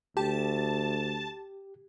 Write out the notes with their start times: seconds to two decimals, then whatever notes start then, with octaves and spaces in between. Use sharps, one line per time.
0.17 D2 G4 A5